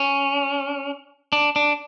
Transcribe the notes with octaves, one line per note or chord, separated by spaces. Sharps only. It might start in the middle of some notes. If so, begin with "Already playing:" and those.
Already playing: C#4
D4
D4